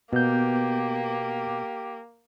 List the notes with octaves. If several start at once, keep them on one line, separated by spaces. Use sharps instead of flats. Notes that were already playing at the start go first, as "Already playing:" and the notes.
B2 A#3 B3 G4 G6